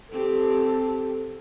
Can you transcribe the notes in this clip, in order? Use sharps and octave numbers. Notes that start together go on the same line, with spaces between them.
C4 G4 A4